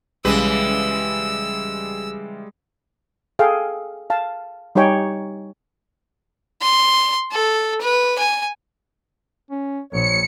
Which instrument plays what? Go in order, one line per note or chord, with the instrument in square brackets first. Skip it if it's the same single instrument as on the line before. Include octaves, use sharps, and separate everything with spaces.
[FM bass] B1 [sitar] C#3 E3 B4 [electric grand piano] G3 G#3 [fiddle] E6
[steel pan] G#4 A4 F5 G5
F5 A5
G3 D#4 G4 C#5 G5 G#5
[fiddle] C6
A4
B4
G#5
[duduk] C#4
[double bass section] A#1 [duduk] C#5 [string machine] C#7